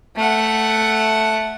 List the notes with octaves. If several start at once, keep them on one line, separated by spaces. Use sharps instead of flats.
A3 F#5